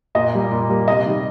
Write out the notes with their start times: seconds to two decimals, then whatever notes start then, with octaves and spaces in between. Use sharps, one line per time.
0.15 A#2 D#5
0.33 G3 A#3
0.52 A#2
0.70 G3 A#3
0.88 C3 D#5
1.06 D#3 G3